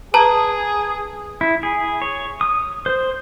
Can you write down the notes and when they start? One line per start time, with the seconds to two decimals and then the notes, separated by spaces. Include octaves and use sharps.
0.14 G#4 B4 A5 A#5
1.41 E4
1.63 G#4
2.02 C#5
2.41 D#6
2.86 C5